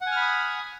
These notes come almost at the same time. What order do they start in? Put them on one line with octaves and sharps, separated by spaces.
F#5 G#5 F6 B5 D#6